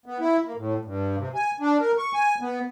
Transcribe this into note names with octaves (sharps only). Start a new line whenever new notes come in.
B3
E4
A#3
A2
G2
C3
G#5
D4
A#4
C#6
G#5
B3